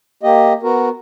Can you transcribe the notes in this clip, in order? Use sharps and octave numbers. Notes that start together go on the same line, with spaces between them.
A#3 G4 D#5
B3 F#4 A#4